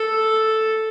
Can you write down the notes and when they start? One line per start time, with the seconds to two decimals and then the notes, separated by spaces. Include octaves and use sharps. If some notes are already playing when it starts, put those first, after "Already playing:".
Already playing: A4